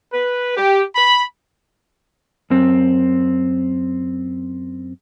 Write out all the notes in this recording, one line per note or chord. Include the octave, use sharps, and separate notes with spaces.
B4
G4
B5
F#2 C4